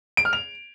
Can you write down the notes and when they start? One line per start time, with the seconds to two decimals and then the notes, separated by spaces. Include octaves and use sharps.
0.17 D7
0.25 F6
0.33 F7